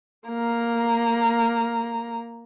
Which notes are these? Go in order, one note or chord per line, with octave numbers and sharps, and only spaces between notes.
A#3 A#5